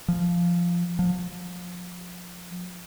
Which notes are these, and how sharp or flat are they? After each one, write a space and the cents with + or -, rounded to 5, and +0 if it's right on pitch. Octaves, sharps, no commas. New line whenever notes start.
F3 -5
F3 +30